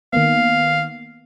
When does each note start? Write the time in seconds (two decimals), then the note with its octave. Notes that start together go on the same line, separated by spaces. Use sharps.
0.13 D#3 A#3 B3 F5